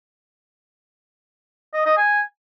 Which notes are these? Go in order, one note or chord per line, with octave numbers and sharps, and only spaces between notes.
D#5
D#5
G#5